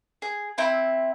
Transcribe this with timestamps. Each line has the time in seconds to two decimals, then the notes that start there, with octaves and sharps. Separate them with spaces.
0.22 G#4
0.58 C4 E4